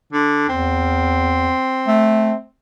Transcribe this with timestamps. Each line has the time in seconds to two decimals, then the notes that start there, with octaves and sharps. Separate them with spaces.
0.12 D3
0.49 E2 C4
1.87 A3